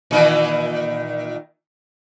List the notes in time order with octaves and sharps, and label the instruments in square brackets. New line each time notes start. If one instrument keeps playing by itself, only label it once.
[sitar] A#2 D#3 E3